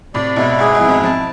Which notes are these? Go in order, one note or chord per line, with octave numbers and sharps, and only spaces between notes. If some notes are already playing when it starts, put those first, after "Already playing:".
A2 C3 D5
G#2 B2 E4
G#2 G#4
G#2
F2 E4
G#2
F2 A5